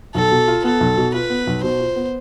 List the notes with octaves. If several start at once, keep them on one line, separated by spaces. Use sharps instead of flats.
B1 A4
B2
F4
B3 A4
B1
B2
F4 B4
B3
B1
B2 C5
F4
B3